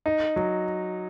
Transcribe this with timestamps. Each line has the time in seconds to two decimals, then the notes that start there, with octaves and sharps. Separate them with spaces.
0.06 D#4
0.36 F#3